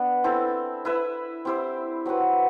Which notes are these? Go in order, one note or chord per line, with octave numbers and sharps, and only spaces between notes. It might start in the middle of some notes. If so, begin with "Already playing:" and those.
Already playing: B3 D4
C4 E4 A4
E4 B4 E5
C4 E4 G4 C5
F#3 C4 F#4 B4